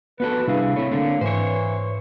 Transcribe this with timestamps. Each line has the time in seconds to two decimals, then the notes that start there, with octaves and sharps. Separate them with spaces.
0.20 B3 F#4 A4 B4
0.47 C3 G3 D4 E4 G#4 F5
0.76 A3 C4 E4 C#5
0.91 D3 A3 A#3
1.21 G#2 E3 C5 C#5